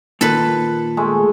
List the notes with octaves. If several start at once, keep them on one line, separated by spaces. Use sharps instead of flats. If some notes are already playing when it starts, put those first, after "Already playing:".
A#2 D#3 A4 B4
G#3 A3